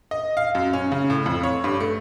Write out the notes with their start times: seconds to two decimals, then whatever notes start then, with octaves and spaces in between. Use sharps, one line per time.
0.11 D#5
0.37 F5
0.55 F#2
0.73 C#4
0.92 C#3
1.10 A2
1.26 F2
1.43 C#5
1.64 G2
1.80 A3